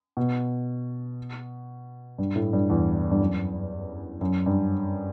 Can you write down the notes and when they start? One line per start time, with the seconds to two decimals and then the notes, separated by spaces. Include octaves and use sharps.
0.17 B2
2.18 G2
2.36 A2
2.53 G2
2.70 E2
3.11 G2
3.20 F#2
4.21 F#2
4.46 G2